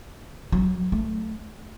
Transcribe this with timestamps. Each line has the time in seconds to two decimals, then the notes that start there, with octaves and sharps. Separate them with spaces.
0.52 F#3
0.92 A3